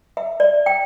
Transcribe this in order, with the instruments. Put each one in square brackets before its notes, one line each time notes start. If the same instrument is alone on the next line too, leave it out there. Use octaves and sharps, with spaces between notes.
[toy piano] E5
D5
G5